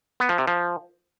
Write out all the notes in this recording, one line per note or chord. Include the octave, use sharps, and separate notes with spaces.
B3
F3
C3
F3